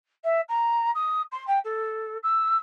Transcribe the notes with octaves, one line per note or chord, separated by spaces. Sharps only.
E5
A#5
D#6
C6
G5
A4
E6